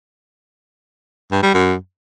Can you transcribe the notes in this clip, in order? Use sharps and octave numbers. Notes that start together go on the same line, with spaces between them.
G2
G3
F#2